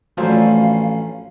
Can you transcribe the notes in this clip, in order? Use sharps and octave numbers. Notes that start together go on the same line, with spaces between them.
A1 F3 F#3 A3 C#4 D4 C5 F5